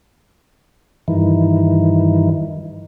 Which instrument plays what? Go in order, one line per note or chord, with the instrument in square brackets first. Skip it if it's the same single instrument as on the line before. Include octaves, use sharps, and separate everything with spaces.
[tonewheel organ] G2 D#3 E3